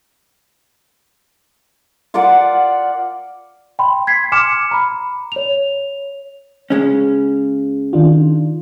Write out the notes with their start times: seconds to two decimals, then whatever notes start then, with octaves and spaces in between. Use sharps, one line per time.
2.14 F4 A#4 D5 F#5
3.79 G5 B5 C6
4.07 G#6 B6 C7
4.32 G#5 C6 D6 F6 C#7 E7
4.71 A#5 B5
5.32 C#5 F7
6.70 C#3 G#3 C#4
7.93 D#3 D4 F4